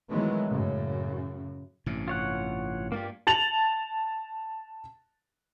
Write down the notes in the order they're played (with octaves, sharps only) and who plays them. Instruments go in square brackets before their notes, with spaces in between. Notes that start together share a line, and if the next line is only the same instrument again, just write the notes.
[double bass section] D#3 E3 F#3 G#3 A3 B3
F#2 A2 C#3
[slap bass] A1 G2 C3
[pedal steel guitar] F4 C#5 F#5
[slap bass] G2 [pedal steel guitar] A#3 F4 G4
[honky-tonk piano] A5 A6 F7 F#7